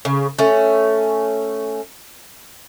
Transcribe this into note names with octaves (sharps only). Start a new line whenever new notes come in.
C#3
A3 C#4